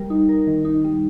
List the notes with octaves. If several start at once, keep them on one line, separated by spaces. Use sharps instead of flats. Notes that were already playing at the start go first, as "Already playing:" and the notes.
Already playing: G3 A#4
D#4
A#4
D#3
D#4
G3